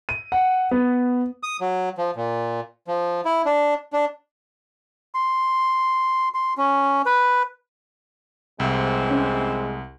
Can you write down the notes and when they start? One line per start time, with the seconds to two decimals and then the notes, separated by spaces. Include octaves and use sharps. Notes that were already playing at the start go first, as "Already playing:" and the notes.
0.09 D#7
0.32 F#5
0.71 B3
1.43 D#6
1.61 F#3
1.98 F3
2.16 A#2
2.88 F3
3.25 E4
3.46 D4
3.93 D4
5.14 C6
6.34 C6
6.58 C#4
7.06 B4
8.60 C2 C3 E3 G#3 C4
9.11 C#4